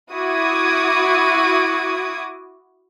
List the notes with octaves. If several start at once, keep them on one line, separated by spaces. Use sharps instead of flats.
E4 F#4 D6 D#6 G#6